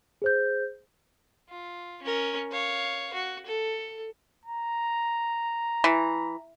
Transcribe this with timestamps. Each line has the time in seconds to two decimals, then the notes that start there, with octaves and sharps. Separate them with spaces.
0.22 G#4 C5 G6
1.49 F4
2.03 C#4 A#4
2.51 C#5 F5
3.14 F#4
3.47 A4
4.45 A#5
5.84 E3